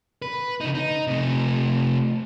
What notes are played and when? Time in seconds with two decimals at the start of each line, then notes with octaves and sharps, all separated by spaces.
0.22 B4
0.61 C#3 D#4
0.75 D#4
1.07 C3 A3